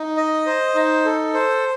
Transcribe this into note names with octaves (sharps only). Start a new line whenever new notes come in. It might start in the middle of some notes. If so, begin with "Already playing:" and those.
Already playing: D#4
D#5
C5
D#4
A4
C5